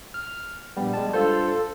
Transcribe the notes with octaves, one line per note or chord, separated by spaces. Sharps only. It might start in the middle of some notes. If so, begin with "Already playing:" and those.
F6
A#1 G3 B3
G#3 A5
G2 F4 A4 C5